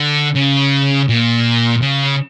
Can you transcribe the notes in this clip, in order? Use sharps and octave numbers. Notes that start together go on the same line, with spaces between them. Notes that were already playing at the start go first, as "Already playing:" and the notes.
Already playing: D3
C#3
A#2
C#3